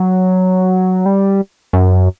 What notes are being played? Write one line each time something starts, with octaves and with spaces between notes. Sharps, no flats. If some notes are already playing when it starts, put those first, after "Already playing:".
Already playing: F#3
G3
F#2